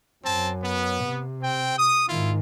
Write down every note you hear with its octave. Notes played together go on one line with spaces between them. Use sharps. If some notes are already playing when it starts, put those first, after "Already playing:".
F#2 C4 A5
B3
C3
C4 G5
D#6
G#2 D#3 E4 F4